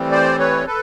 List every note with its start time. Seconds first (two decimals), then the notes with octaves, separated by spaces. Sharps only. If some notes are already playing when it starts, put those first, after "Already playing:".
Already playing: A2 E3 G3 C4
0.12 C5 D5
0.39 B4 C#5
0.67 A4 B4